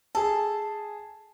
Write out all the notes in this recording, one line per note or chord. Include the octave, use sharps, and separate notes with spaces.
G#4 A4 A5